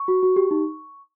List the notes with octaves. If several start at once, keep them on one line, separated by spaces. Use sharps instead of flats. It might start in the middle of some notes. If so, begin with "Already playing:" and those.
Already playing: C#6
F#4
F#4
G4
D#4